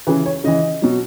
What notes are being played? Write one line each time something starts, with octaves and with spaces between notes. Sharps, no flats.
C#3 E3 B4
C#5
C#3 E3 D#5
B2 F#3